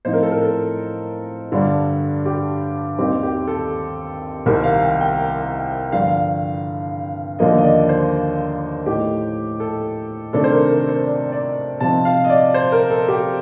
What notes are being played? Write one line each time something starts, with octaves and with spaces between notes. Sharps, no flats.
A2 F3 C4 D#4 C5
A#4
A4
A#4
A4
G2 D3 G3 D4
G4
D#2 D#3 G3 C4 D#4 G4
G4
A4
C2 C3 D#3 G3 C4 A#4
F5
G5
G5
G2 D3 F3 F5
D#2 D3 F3 A#3 D#5
D#5
D5
C5
A2 A3 D#4 G4
A4
C3 D#3 A3 D4 A4
C5
A#4
A#4
C5
D5
D5
C3 F3 C4 D#4 A5
F5
D#5
D5
C5
A#4
A4
G4